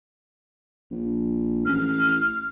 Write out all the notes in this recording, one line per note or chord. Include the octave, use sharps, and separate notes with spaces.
A#1
A1 F6